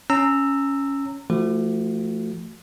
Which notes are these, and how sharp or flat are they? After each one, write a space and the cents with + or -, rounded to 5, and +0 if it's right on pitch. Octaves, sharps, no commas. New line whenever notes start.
C#4 +0 A#5 -25 E6 +0
F3 -25 A3 +15 F#4 +0